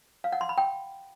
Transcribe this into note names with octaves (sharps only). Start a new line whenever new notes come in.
F5
F#5
C6
B5
G5